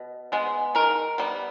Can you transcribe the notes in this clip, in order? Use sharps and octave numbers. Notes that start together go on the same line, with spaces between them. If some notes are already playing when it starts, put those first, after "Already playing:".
Already playing: B2
G#3 B3
D#3 A#4
G3 B3